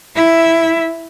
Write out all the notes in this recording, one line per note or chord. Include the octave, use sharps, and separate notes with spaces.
E4 E5